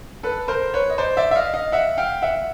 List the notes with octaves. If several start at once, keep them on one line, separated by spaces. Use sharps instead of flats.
A4 B4
A#4 C5
B4 C#5
D#5
C5 D5
D5 E5
E5
D#5 F5
D#5 F5
E5 F#5
F5 G5
E5 F#5